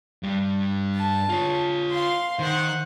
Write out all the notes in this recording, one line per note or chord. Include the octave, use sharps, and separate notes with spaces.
G2 G3
A5
F4 C#5
F5 C6
D#3 C5 F#5